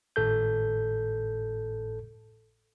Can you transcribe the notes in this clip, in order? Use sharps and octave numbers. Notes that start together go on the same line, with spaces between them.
G#1 A2 A4 G6